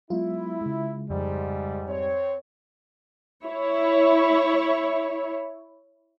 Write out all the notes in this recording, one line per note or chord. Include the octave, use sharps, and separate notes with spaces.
F#3 G#3 B3 E4 F4
C#3 G#3
F2 G#2 G3
C4 C#5
E4 C#5